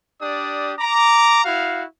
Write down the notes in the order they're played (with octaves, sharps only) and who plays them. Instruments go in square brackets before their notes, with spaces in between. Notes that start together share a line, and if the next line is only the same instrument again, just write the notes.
[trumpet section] D4 G4 D5 D#6
A#5 D6
E4 F#4 F5